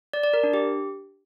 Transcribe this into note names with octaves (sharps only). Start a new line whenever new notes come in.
D5
D5
A#4
D4
G4